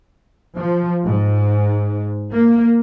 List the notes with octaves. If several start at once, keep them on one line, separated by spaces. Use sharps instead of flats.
F3
G#2
A#3